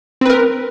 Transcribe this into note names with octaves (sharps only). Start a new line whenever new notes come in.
C4 A#4 B4